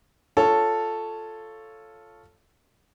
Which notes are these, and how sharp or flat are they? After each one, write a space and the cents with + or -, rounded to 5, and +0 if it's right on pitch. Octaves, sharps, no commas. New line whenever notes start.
F4 +0 A4 +0 C#5 +0